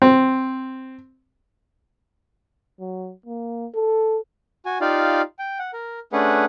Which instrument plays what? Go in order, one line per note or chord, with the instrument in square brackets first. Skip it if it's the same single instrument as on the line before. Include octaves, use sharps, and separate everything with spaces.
[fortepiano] C4
[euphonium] F#3
A#3
A4
[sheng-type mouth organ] F#4 G#5
D#4 F4 G4 D5 F5
G5
F#5
A#4
A3 C#4 D4 G#4 B4 F#5